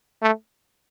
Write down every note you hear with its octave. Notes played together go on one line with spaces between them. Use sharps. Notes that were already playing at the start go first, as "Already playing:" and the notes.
A3